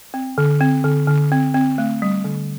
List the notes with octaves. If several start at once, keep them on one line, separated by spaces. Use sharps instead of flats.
C4
D3
C4
D3
D3
C4
C4
A3
G3
D3